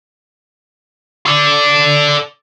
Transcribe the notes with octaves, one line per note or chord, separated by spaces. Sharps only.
A4 D5